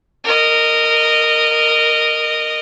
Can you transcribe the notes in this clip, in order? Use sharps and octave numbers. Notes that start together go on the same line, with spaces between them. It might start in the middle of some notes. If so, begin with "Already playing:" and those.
A#4 D#5